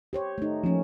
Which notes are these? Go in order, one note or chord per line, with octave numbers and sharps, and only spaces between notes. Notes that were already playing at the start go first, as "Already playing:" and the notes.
G4 C5 C#5
A3 D#4
F3 A3 A#3 C#4